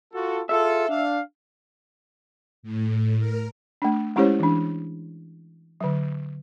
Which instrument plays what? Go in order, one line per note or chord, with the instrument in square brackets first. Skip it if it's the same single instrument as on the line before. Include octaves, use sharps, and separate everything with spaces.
[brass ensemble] F4 F#4 A4
[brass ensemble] F4 G#4 A4 [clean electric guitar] E5
[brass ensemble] D4 F5
[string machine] A2
A#4
[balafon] A3 D4
G#3 C#4 E4 G4 C5 C#5
E3 D4
D3 F#3